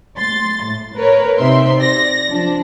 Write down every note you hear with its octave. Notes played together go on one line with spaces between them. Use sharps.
C6 A6
A2
A#4 B4 C#5
C3 C4 D#4 E5 C6
D5 A#6
F3 D4